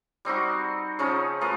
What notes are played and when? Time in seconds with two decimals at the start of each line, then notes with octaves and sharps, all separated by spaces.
0.25 G3 C4 D#4 F#4
0.99 C#3 F3 C#4 D#4
1.41 A3 F4 A#4 B4